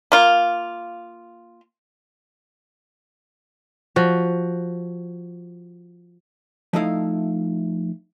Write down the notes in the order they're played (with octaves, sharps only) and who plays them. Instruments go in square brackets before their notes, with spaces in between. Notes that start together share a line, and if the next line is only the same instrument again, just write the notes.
[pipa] A#3 F4
[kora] F3 F#4
[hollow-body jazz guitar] F3 A3 D#4 E4 F5